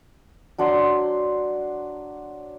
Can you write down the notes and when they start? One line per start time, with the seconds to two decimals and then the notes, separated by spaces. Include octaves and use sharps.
0.58 F#3 D4 F#5 C6